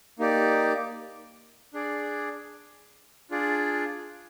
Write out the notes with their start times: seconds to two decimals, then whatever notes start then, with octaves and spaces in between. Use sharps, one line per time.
0.19 A#3 D#4 G4 D5
1.73 D4 G#4 D5
3.30 D4 F4 G#4 D5